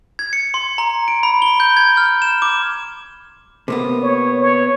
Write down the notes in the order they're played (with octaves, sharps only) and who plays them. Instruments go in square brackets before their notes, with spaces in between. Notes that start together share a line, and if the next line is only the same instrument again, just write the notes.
[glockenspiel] G#6
C#7
C6
A#5
D7
B5
G7
G6
G#6
F6
E7
D6
[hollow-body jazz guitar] C3 A#3 B3
[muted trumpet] C#5
C#5